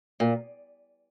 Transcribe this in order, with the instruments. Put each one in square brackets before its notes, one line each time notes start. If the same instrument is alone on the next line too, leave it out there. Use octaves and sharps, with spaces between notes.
[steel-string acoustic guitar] A#2